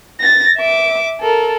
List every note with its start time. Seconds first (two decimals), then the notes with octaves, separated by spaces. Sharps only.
0.20 A6 A#6
0.57 E5 D6
1.21 A4 A#4